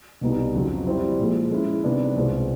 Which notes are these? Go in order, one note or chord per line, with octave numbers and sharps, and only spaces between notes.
C2 B2 G3 B3 D#4
F2 C#3 F#3
G3 C4 E4
A#2 F3 G#3
G#3 C#4 E4
C3 D#3 G3 B3 D4
C2 B2 G#3 C4 F4